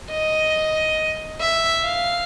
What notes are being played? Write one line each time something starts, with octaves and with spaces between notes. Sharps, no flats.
D#5
E5
F5